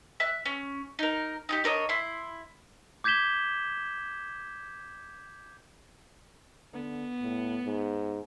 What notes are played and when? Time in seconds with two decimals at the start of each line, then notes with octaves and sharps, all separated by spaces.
0.20 E5 F#6
0.45 C#4
0.99 D#4 A#4
1.49 D#4 F4 G4
1.64 D4 A#4 C#5 D#5
1.89 E4 C6
3.04 D6 G6 G#6 B6 E7 G7
6.74 D3 B3
7.22 A2
7.64 G#2